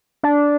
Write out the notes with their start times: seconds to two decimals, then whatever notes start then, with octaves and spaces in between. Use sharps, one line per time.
0.23 D4